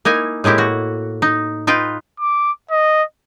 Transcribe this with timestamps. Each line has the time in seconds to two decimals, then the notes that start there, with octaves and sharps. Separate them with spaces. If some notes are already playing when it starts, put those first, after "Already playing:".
0.05 A#3 D#4 E4 G#5
0.44 A2 G#3 A#3 E4 G4
0.58 F#4
1.22 D#4
1.67 D#4 F4 B4 G5
2.20 D6
2.71 D#5